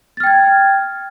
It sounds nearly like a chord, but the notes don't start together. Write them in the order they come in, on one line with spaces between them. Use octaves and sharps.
A6 F6 G5 G#6